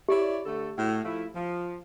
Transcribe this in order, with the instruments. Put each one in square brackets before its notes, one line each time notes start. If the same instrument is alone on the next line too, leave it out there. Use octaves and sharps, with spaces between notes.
[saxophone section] E4 C#5 D5 [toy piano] G4
[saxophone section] D3 A3 A4
A2 F#4
F3 A3 E4
F3